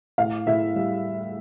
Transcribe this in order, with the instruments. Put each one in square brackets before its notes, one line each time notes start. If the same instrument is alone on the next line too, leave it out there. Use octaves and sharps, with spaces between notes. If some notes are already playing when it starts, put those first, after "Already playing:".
[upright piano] A2 F5
A2 E5
G3